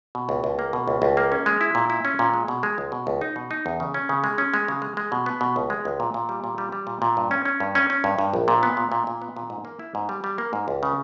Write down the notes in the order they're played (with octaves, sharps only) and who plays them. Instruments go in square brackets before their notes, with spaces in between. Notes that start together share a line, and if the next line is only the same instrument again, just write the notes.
[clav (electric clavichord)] B2
C#2
C#2
A#3
B2
C#2
C#2
A#3
C#4
G#3
E4
A#2
E4
C#4
A#2
G#3
B2
G#3
C#2
B2
C#2
D#4
B2
D#4
E2
C#3
C#4
C#3
G#3
C#4
G#3
C#3
G#3
G#3
B2
B3
B2
C#2
G#3
C#2
A#2
A#2
G3
A#2
G3
G3
A#2
A#2
G2
C#4
C#4
G2
C#4
C#4
G2
G2
A#1
A#2
B3
A#2
A#2
A#2
B3
A#2
G#2
A#3
E4
G#2
G3
G3
A#3
G#2
C#2
C#3